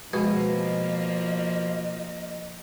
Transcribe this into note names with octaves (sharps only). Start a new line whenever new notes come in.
B2 F3 G#3 A#3 G#4 B4 D#5 G#5